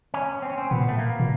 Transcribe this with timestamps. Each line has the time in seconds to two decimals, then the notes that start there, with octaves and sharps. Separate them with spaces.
0.14 C#4
0.42 C4
0.50 C#4
0.58 C4
0.71 A#2 B3
0.88 A3
0.99 A#3
1.20 A#2